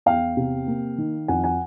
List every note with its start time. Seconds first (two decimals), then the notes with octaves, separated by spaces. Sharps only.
0.06 E2 F5 G5
0.37 C3
0.67 A#3
0.98 D#3
1.28 F2 F#5 G#5
1.44 F#5 G#5